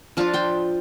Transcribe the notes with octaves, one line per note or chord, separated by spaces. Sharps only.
F3 D4 F4 F5 A5
G5 C6